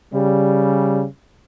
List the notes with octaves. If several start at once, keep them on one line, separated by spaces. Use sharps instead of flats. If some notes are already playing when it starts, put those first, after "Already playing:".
C#3 G3